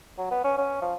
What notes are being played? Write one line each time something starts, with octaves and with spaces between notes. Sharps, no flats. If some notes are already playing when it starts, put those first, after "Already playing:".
F#3
B3
C#4
C#4
F3